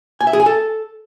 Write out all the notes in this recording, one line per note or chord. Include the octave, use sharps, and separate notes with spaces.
G#5
E5
G#4
G#5
A4